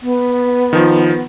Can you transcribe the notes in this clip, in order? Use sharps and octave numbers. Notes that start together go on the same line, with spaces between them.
B3
D#3 F3